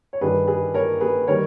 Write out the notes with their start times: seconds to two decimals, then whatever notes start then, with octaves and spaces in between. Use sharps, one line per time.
0.13 C#5
0.21 G2 D#3 G3 G#4 B4
0.48 G#4 B4
0.74 A#4 C#5
1.01 G#4 B4
1.27 D#3 G3 A#4 C#5